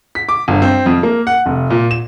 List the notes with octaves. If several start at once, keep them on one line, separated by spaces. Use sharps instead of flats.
B6
D6
G1
C4
F2
A#3
F#5
F1
A#2
E7